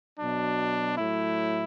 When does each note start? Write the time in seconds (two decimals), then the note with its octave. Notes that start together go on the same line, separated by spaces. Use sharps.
0.18 B2 F#3 D4
0.97 A2 F#3 E4